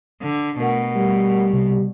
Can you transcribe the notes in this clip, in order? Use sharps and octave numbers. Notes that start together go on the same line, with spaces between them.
D3
B2 A3 A#4 F#5
G3
C3